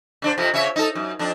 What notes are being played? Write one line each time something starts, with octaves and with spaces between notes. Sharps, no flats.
C#3 D4 C5
F2 C3 F3
C#3 C#5 E5
D#4 A4
F#2
F2 D4